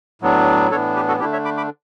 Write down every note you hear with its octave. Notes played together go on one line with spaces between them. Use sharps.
A2 F#3 B3 D4
A2 E3 B3 D4 A4 C#5
G4 B4
F#4 A4
D3 A3 D4 E4 G4
C#5 E5
B5 D6
B5 D6